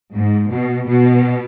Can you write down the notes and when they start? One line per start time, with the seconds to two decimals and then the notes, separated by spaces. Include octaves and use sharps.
0.13 G#2
0.50 B2
0.87 B2